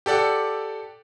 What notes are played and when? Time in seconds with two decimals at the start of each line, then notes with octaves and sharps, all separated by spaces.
0.06 G4 A4 D5 F#5